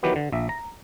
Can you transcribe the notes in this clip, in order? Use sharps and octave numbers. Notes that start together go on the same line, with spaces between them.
D#3 E3 F#3 B3 G4 B4
D3
A#1 E5
A#5